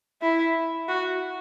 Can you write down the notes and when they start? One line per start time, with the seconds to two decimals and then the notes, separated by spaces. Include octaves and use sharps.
0.22 E4
0.88 F#4